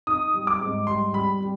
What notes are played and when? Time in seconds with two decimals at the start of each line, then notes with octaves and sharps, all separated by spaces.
0.07 D#4 D#6
0.34 G3
0.47 D6
0.61 G#2
0.87 G3 C6
1.13 G3 B5
1.40 G3